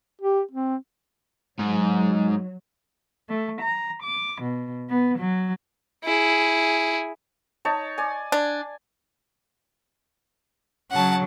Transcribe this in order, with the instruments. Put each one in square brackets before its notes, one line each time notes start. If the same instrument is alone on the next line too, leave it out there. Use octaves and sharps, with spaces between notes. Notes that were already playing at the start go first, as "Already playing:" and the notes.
[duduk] G4
C4
[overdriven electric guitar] G#2 [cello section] F#3
[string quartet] A3
A#5
D6
B2
B3
F#3
[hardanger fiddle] E4 G#4
[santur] D#4 C#5 A5
D5 G#5
[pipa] D4
[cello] C#3 F#3 [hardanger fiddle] F#5 A5